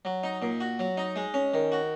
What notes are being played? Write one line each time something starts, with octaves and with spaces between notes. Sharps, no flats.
F#3
D#4
A#2
F#4
F#3
D#4
G#3
C#4
D#3
F#4